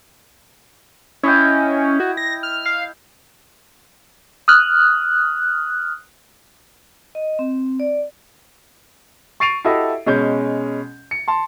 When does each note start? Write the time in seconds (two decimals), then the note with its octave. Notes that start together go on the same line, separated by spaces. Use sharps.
1.23 C#4 E4 D#5 G5
2.00 F#4
2.17 A#6
2.43 F6
2.66 F5
4.48 D#6 F6 F#6
7.15 D#5
7.39 C4
7.80 D5
9.40 C#6 A6 C7 D7 D#7 F7
9.64 E4 F#4 G4 A4 D#5 E5
10.06 B2 G#3 C#4 G6
11.11 C#7
11.28 A5 C6